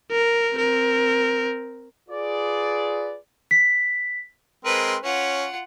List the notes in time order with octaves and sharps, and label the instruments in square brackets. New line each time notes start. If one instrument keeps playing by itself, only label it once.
[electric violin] A#4
C4 A#4
[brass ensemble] F4 G#4 B4 D5
[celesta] B6
[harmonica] G#3 C4 A#4 [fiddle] B4
[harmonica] C#4 [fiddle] F4 F#5